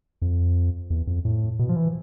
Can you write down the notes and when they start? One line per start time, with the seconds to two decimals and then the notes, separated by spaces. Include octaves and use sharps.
0.22 F2
0.90 E2
1.07 F2
1.25 A2
1.59 B2
1.69 F3
1.76 E3